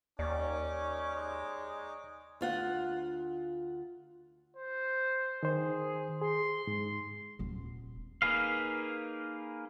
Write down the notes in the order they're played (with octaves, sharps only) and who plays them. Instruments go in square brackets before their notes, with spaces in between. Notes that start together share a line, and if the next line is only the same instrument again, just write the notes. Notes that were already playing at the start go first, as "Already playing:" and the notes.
[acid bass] D#2 [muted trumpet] C#4 [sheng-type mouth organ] D#4 C#5 D6 [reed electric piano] D5
[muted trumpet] G#3
[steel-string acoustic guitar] D2 F4 F#5
[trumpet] C5
[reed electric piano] D#3 C5 [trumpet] G#4
[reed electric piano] G#4 [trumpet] C6
[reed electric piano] G#2
[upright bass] D#1 B3
[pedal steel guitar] A#3 D#4 G#4 B4 F5